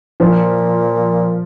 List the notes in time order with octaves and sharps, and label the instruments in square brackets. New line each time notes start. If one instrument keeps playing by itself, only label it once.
[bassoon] A#2 [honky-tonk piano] F3